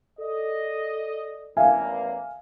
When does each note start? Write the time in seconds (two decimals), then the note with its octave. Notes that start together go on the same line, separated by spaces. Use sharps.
0.18 A4 D5 D#5
1.57 A1 E2 A#3 E5 F5 G#5